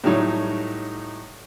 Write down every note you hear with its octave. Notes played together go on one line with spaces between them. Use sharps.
A2 F#3 G3 D#4 C#5